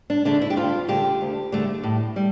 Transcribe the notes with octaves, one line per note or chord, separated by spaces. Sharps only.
D4
D3 A3 D4
E4
G4
D2 F4
D3 A3 G4
D2
D3 A3
A2
G3